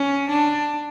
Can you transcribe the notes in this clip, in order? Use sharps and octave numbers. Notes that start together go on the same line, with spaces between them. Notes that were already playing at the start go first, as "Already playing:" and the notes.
Already playing: C#4
D4